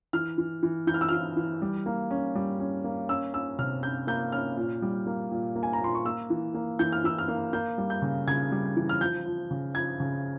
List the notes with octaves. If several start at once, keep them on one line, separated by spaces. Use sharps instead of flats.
E3 F6
E3
E3
E3 G6
F6
E6
E3 F6
E3
G3
A#3
C#4
G3
C#4
A#3
C#4 E6
C#4 E6
C3 F6
C#4 G6
A#3 G6
C#4 F6
A#2
G3
A#3
A#2
A#3
G#5
A#5
A#2 C6
C#6
A#3 E6
E3
A#3
E3 G6
F6
E3 E6
F6
A#3
A#3 G6
G3
G6
C#3
C#3 G#6
G3
E3
F6
F3 G6
F3
C#3
F3 G#6
C#3